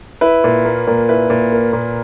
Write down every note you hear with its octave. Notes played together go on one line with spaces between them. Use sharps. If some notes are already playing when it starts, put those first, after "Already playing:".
E4 B4
A#2
A#3
A#2
E4 B4
A#2
A#3
A#2